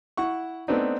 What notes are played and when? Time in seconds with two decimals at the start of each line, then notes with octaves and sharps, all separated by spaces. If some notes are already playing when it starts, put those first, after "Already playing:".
0.17 E4 F#5 C#6
0.68 A3 B3 C4 D4 D#4